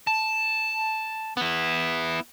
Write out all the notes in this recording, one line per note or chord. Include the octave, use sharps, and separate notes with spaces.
A5
B3 E4